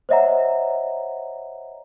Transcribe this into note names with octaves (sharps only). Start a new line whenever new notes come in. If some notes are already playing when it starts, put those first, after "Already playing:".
C5 C#5 D#5 E5 F#5 A#5